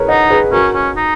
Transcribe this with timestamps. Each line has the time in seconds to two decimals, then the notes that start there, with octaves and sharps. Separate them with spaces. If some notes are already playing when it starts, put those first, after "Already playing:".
Already playing: G#4 A#4 B4 C#5
0.08 D#4 D#5 F#5
0.30 G#4 B4
0.52 C#4 F#4 A#4
0.74 C#4
0.96 D#4